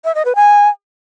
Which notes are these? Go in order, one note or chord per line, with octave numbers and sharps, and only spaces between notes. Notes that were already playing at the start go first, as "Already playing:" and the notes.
E5
D#5
B4
G#5